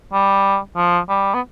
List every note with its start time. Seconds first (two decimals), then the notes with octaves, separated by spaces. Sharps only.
0.13 G3
0.77 F3
1.09 G3
1.34 B3